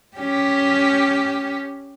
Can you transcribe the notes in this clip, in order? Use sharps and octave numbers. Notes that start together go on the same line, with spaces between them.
C#4 G4